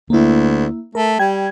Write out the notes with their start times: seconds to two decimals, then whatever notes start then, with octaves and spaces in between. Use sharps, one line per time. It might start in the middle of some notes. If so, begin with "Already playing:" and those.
0.10 D2 A#3 E4
0.95 A3 A#4
1.19 G3 G5 G#6